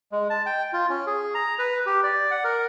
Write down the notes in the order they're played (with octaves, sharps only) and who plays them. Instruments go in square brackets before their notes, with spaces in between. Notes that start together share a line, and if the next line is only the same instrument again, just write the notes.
[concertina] G#3
A5
G5
F4
C#4
G#4
A#5
B4
G4
D5
F#5
A#4